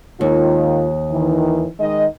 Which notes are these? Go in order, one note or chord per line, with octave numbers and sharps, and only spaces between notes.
D#2 D#3 G#3 F4
D#3 E3
D#3 G#3 D#5